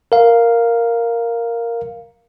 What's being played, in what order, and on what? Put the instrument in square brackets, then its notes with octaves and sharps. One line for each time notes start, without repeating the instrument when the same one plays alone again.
[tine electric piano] A#4 F5